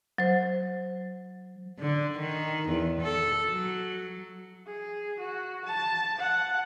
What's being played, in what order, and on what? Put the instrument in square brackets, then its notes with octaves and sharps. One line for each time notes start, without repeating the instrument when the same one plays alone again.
[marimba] F#3 C5
[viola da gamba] D3
D#3
E2
A4
F#3
[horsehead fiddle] G#4
F#4
A5
F#5